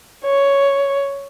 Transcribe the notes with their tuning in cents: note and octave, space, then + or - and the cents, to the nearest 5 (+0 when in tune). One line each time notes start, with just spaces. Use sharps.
C#5 +5